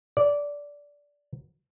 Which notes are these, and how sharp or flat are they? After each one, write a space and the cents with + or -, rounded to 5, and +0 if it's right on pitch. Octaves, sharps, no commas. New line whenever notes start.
D5 -15